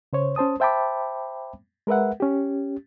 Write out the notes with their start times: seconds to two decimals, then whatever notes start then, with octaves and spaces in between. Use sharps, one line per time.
0.13 C#3 C5 C#5
0.36 C#4 C5 A5 D#6
0.60 C5 E5 G5 A5 B5 D6
1.87 G#3 A#4 B4 E5 F#5
2.20 C#4 G4